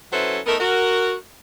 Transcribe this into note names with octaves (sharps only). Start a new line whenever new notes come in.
F#3 C#4 E4 A4 B4 C5
A3 B3 D#4 A4 A#4
F#4 A#4